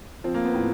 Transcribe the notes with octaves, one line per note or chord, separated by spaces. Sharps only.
F3 C4
A#3
B3
A2